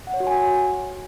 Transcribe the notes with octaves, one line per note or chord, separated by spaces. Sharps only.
F#5
C#5
F#4
G#5